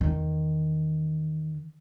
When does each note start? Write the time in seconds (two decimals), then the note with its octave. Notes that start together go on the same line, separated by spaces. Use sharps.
0.01 E2 D#3